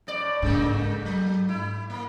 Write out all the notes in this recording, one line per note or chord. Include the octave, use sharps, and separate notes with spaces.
A2 D5
G#2 C#3 A3 A#3
F#3
E4
A#3